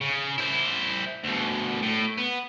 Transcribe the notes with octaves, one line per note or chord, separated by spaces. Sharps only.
C#3
E4 C5
D2 B2
A2
B3